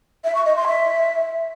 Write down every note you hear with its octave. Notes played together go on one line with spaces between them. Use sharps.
E5
C#6
D#5
C6
E5